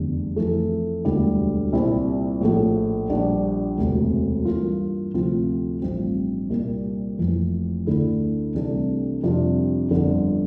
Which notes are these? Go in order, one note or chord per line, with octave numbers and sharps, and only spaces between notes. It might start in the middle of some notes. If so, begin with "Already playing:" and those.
Already playing: F1 E2 D3 G3
F2 E3 A3
E1 D2 D3 G3
C2 A#2 G3 C4 E4
A#1 A2 F3 A3
A#1 A#2 G3 D4
E1 D2 C3
G2 E3 A#3 F4
D2 C3 F3 C4 F4
A1 G2 F3 C4
C2 A#2 G3 A#3
F1 F2 E3
D2 D3 A3 E4
C2 C3 E3 A3 D4
F2 C3 G3 D4 F4
G1 F2 D3